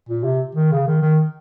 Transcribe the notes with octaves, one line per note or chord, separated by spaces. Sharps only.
A#2
C3
D#3
C#3
D#3
D#3